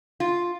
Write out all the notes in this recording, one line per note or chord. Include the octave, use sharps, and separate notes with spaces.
F4